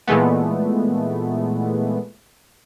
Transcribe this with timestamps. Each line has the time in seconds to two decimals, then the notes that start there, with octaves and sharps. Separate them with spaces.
0.07 A#2 E3 G#3 A3 B3